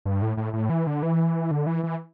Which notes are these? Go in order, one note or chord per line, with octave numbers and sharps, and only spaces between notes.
G2
A2
A2
A2
E3
D3
E3
D3
E3
E3